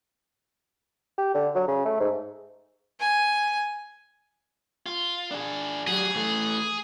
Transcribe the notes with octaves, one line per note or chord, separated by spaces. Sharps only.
G4
D3
F#3
C#3
A3
G#2
G#5
F4
D4 G#4
F#3 G3 G#4
E3 A3